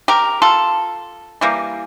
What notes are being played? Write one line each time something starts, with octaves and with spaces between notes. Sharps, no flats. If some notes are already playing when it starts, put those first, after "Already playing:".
G4 A#4
F4 A4
E3 G3 A#3